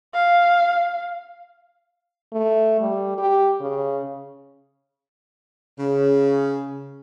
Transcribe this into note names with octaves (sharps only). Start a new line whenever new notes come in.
F5
A3
G3
G4
C#3
C#3